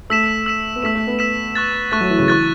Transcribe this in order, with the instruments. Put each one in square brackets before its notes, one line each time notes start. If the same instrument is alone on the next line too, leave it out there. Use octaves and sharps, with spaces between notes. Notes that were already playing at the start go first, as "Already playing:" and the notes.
[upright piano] A3 [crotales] E6 B6 E7
[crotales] E6 B6 E7
[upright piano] B3
[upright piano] A3 [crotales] E6 B6 E7
[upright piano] A3
B3
[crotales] E6 B6 E7
C#6 F#6 A6
[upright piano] A3 [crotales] C#6 F#6 A6
[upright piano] F#3
E3
C#3
[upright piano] E3 [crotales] C#6 F#6 A6